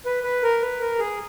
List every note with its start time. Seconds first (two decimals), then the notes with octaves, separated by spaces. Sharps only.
0.06 B4
0.23 B4
0.43 A#4
0.62 B4
0.80 A#4
0.99 G#4